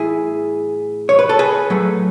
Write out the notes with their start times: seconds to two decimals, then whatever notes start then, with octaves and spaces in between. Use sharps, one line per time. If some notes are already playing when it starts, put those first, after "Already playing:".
Already playing: A2 E3 E4 G#4
1.09 C#5
1.19 B4
1.29 A4
1.39 G#4 B4
1.70 A2 F#3 A3